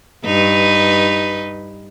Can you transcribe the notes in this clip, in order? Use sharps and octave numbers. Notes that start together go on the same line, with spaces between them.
G2 D#4 B4